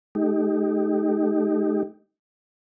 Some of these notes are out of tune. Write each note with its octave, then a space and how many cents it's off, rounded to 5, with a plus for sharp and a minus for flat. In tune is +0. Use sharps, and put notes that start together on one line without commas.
A3 -40 D#4 +0 G4 +0